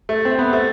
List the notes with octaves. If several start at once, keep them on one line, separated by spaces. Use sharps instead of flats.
A3
C4
B3
A3